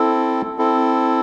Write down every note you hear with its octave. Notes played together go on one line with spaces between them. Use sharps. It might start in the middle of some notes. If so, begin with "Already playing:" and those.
Already playing: C4 E4 A4
C4 E4 A4